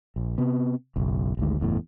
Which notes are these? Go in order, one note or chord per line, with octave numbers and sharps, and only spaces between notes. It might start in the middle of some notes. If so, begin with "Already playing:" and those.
A#1
C3 B3
F#1 B1
G#1 D2 G#2
F#1 E2 A2